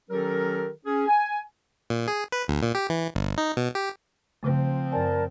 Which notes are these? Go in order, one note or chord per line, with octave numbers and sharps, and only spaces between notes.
D#3 F#3 C#4 G4 A4 A#4
C#4 G#4
G#5
A#2
G#4
B4
D2
A#2
G4
E3
G1
D#4
B2
G4
C#3 F3 A3 C4
F#2 A#4 D5 G#5 A5